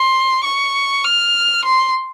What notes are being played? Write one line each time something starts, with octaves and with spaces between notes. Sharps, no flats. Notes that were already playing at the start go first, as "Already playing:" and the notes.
Already playing: C6
C#6
F6
C6